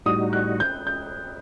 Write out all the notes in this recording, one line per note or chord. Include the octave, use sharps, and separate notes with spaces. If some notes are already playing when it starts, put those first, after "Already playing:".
A2 G3 D#4 F#4 D#6
F#6
G6
G6